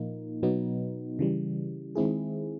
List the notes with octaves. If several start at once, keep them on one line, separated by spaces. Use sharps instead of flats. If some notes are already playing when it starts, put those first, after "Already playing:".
Already playing: A#2 F3 A#3 D#4
B2 F#3 B3 D#4
C#3 E3 G3
D#3 G#3 C4 E4 G#4